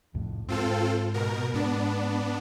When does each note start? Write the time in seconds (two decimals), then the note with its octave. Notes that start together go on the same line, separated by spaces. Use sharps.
0.14 C2 F2 A2
0.48 G#2 C4 F4 A4
1.14 B2 A#4
1.54 G#2 B3 D4